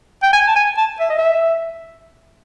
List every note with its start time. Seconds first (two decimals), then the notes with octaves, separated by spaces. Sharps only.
0.23 G5
0.33 G#5
0.47 A5
0.56 G#5
0.77 A5
1.00 E5
1.10 D#5
1.19 E5